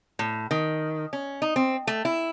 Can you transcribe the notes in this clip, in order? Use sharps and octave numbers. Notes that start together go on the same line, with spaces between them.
A2
D#3
C#4
D#4
C4
A3
E4